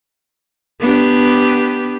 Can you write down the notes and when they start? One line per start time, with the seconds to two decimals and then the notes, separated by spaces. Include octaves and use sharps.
0.81 B3 D4 G4